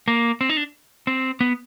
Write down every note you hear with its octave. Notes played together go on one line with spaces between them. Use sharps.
A#3
C4
D#4
D4
C4
B3